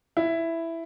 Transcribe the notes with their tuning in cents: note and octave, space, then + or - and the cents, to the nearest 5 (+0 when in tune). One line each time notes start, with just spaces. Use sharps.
E4 +5